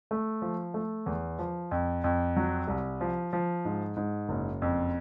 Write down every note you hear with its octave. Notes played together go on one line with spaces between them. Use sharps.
A3
F3
A3
E2
F3
F2
F2
F#3
C2
F3
F3
G#2
G#2
F#1
F2